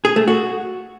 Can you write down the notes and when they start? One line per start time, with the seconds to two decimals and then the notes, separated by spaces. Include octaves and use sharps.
0.05 G#4
0.16 A3
0.28 F#4